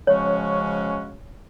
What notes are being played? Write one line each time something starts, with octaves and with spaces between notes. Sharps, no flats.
C#3 F3 G#3 C#4 F#4 C#5